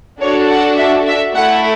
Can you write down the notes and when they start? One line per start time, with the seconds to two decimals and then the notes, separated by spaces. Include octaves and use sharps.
0.21 D4 F#4 A4 C#5
0.50 F#5
0.78 E5
1.07 E5
1.35 A3 E4 A4 F#5